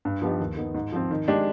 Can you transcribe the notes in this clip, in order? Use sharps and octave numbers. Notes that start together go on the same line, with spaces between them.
G2
F3 B3 D#4 G4
D#2
D#3 B3
G#2
F3 C4
D#3
G#3 D4 G4